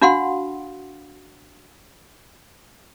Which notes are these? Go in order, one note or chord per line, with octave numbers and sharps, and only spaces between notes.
D4 F#4 F5 F#5 C6